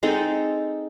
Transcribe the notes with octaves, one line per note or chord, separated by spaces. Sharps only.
G#3 C4 D#4 A4